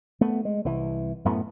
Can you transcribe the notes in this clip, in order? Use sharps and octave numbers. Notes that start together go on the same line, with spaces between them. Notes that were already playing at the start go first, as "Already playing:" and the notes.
A3 B3
G#3
C2 E3
F#2 A2 A3 B3